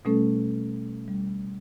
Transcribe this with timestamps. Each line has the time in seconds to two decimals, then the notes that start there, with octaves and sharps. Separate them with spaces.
0.05 B2 G3 A3 C#4 A4
1.08 G3